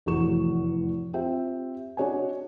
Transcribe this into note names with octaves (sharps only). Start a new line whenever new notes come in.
F1 E2 A2 F#4 C#6 E7
C4 F4 G4 C5 E5 G5
D4 F#4 C#5 D#5 G#5